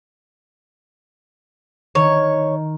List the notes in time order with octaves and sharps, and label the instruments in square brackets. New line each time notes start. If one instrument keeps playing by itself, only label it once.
[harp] D#3 [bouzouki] C#5